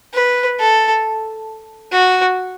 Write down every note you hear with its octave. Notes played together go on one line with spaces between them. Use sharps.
B4
A4
F#4